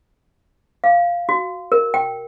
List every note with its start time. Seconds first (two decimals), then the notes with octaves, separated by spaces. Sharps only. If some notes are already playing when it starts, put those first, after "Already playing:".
0.84 F5
1.29 F#4
1.72 A#4
1.94 G5